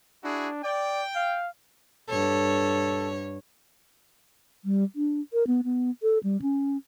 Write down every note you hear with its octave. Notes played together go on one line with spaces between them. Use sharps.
D4 E4 F#4 G#4
D5 G5
F5
G2 A4 C#5
G3
D4
A#4
B3
B3
A4
G3
C#4